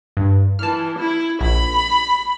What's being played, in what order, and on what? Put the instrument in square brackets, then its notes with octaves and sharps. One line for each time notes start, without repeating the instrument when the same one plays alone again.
[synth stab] G2
[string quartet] E3 [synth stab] A5 F6
[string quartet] E4
[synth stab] A#1 [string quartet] B5